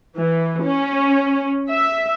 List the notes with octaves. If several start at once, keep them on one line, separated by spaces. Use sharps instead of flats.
E3
C#4
E5